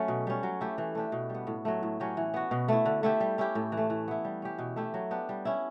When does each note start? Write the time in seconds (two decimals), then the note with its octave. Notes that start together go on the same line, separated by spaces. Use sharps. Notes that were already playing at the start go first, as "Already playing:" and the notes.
Already playing: F#3 A3 C#4
0.08 B2
0.27 G3 C#4
0.43 F#3
0.61 A3 E4 G4
0.78 E3
0.95 A3 D4 G4
1.12 B2
1.30 G3 B3
1.47 A2
1.65 F#3 A3
1.83 A2
2.00 F#3 C#4 G4
2.17 E3
2.34 B3 F#4
2.51 B2
2.68 A3 E4
2.86 D3
3.03 A3 E4 G4
3.20 G3
3.38 C#4 E4 G4
3.55 A2
3.72 E3
3.77 A3
3.90 E3
4.08 B3 E4
4.25 G3
4.42 C#4 G4
4.59 B2
4.76 A3 E4 G4
4.94 F#3
5.11 B3 D4 G4
5.29 G3
5.45 C#4 E4